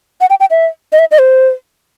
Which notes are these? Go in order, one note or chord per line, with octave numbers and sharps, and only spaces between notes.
F#5
G5
G5
E5
D#5
E5
D#5
C5